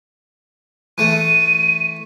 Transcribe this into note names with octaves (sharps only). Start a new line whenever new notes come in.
E3 A3 D#7